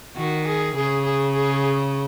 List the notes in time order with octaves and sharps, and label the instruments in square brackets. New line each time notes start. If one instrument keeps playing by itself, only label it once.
[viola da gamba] D#3 [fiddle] F#4
[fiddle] G#4
[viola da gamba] C#3 [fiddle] G#4
[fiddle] G#4
G#4